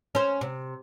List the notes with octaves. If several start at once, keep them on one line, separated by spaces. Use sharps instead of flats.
C#4 C5
C3